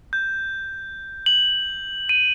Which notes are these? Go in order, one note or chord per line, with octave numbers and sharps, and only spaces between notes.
G6
F#7
D#7